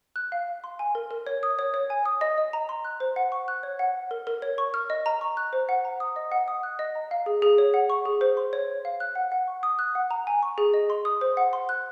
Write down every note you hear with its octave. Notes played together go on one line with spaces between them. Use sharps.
F#6
F5
F5
C6
G#5
A#4
A#4
C#5
D#6
C#5
C#5
G#5
D#6
D#5
D#5
A#5
C6
F#6
C5
F#5
C#6
F#6
C#5
F#5
F#5
A#4
A#4
C#5
C#6
F6
D#5
A#5
C#6
F#6
C5
F#5
A#5
D#6
D#5
F#5
D#6
F#6
D#5
A#5
F5
G#4
G#4
C#5
F#5
C#6
G#4
C5
C6
C#5
C#5
F5
F#6
F#5
F#5
C#6
D#6
F#6
F#5
A#5
G#5
C#6
G#4
D#5
C6
D#6
C5
F#5
C6
F#6